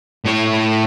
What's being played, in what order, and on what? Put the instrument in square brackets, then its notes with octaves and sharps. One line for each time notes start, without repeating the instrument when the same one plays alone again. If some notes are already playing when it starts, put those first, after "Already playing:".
[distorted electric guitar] A2 C#5